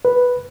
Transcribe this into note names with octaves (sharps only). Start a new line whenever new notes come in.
B4